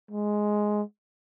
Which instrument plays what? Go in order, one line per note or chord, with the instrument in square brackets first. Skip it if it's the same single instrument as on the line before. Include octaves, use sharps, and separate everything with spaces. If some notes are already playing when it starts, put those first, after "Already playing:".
[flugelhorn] G#3